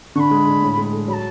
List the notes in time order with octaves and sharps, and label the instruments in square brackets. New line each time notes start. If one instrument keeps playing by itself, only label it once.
[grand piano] D3 [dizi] C#6
[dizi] B5
[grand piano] G#3
D3
A2
G#3
A4
[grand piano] F#3 [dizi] B5
[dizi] A5